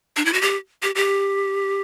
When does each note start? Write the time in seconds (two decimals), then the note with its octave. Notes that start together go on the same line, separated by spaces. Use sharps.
0.16 D4
0.25 E4
0.33 F#4
0.41 G4
0.83 G4
0.95 G4